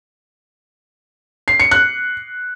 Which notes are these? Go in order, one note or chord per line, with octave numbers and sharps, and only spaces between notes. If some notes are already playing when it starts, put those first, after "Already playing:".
C7
C#7
F#6